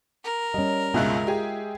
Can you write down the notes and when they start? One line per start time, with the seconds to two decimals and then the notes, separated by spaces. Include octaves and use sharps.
0.24 A#4
0.54 G3 C#4 D#5
0.94 C#2 G2 B2 G#3 F4 E5 F#6
1.27 G4 G#4